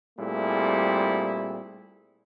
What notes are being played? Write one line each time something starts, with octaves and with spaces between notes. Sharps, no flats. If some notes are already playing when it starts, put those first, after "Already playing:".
A#2 G3 A3 C4 E4 G#4